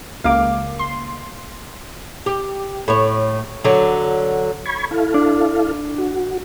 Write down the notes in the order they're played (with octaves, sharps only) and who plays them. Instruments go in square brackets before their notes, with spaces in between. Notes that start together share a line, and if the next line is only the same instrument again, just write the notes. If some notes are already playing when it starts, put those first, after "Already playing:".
[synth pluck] C#2 A#3 D6 [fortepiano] F5
[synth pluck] C6
[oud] G4
A2 C#5
D3 F#3
[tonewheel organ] B5 C#6 G#6
E4 A4 F5
[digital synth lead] D4
[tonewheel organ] F#4